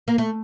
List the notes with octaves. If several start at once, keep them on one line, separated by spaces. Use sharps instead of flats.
A#3
A3